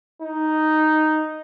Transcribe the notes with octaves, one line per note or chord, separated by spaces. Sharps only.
D#4